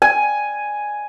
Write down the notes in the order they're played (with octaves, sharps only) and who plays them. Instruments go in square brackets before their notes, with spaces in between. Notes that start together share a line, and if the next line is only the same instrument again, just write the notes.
[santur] G#5